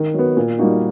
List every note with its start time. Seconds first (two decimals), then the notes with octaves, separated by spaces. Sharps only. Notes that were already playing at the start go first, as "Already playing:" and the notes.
Already playing: D#3
0.14 F#3 B3
0.37 A#2
0.59 G3 A#3 D#4 F#4